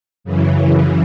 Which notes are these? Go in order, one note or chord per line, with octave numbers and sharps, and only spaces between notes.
F#2 C#3 E3